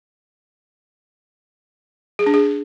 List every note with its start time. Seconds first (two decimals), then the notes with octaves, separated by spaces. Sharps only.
2.19 G#4
2.26 D4
2.34 G#4